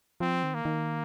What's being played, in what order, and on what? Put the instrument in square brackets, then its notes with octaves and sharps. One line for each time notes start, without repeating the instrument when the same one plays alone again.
[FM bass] F3 [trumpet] C4
[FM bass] D#3
[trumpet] A#3
[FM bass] D#3